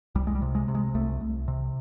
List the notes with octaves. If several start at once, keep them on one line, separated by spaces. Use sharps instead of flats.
C2 G3
G#3
G3
C3
G#3
C3
G#3
C2 A3
C2
C3